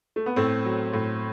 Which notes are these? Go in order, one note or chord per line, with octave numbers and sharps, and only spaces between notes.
A3
B3
A2 A3 C4
F#3
A2